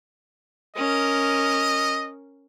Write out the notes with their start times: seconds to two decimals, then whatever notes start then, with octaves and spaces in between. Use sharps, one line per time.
0.76 C#4 A#4 D#5